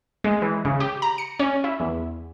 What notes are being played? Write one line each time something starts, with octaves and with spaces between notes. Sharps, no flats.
G#3
E3
C#3
G4
A#5
C#7
C#4
E4
E2